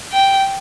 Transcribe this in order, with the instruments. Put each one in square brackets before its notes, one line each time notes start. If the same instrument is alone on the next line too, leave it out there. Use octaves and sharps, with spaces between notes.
[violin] G5